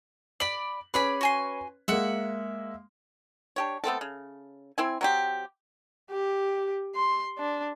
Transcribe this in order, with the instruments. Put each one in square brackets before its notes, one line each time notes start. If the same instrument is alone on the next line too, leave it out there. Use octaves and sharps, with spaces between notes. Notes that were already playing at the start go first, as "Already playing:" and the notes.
[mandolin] D5 B5 [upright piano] F#7
[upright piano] C#4 B4 [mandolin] G#4 D5 B5
[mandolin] F#4 G#5 C6
[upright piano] G#3 A#3 [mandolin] E5 F#5
[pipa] D4 G4 C#5
A3 B3 C4 A4
C#3
C4 E4 G#5
F#3 C4 G4
[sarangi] G4
C6
D4